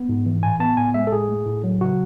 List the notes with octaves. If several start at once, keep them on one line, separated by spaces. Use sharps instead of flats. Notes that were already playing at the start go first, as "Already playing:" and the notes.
Already playing: B3
G#2
E3
A2 G#5
B3 A5
A2 G#5
G#3 E5
A4
A2 G#4
A3
A2
F#3
C#3 F#4